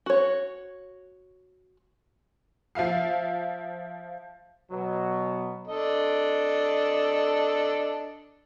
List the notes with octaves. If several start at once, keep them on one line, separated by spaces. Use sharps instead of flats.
F#4 C#5
F3 E5 F5 C7
B2 F#3
D4 A4 D#5